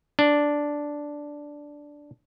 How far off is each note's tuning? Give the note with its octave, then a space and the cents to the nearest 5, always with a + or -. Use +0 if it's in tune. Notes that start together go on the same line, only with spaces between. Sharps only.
D4 -5